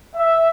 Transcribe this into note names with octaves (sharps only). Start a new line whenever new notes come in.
E5